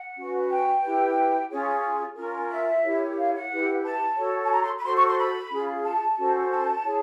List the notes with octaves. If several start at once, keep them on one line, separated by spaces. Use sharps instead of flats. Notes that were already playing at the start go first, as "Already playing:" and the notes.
Already playing: F#5
C#4 F#4 B4
G5
E4 G4 B4
C#4 F4 G#4 C#5
C#4 F4 A#4
E5
E4 G4 A#4 C#5
F5
F#5
E4 G4 B4
A5
F#4 A4 C#5
A5
A#5
C6
B5
F#4 A4 C5 C6
C#6
C6
B5
C#4 F4 G#4
A5
C#4 F#4 A4 C5
A5
E4 G#4 C#5